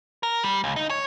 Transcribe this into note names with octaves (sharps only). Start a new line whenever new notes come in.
A#4
G3
C#2
D#4
C#5